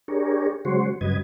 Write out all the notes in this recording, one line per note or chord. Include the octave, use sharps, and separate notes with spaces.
D4 G4 G#4 A#4 C#5
C#3 F#3 G#3 F#4 C5 C#5
G2 C#3 F#3 B4 D#5 G#6